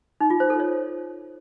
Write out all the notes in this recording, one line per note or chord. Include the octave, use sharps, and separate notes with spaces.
D#4
F4
C5
A4
C#5